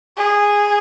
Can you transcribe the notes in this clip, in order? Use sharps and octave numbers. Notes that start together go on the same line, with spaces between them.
G#4